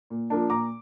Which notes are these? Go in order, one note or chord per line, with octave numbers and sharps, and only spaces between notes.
A#2
F3 A#3 D4
A#2 A#5 D6